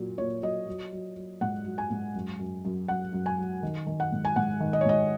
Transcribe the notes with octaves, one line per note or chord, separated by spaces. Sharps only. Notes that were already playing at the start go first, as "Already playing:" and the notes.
Already playing: A#2 F#3
A#2 C#5
F#3 D#5
F#3
F#3
F#3
G#2 F#5
F#3
G#5
G#2
F#2
F#2
F#2
F#2 F#5
F#2
G#5
F#3
D#3
D#3
F#5
G#2
G#5
G#2 F#5
D#3
D#5
C#5
G#2 D#5